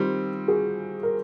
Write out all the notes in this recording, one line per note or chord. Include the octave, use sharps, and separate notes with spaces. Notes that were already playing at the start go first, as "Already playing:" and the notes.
Already playing: D#3 G3 C4 F4 G4
F#4 G#4
A#4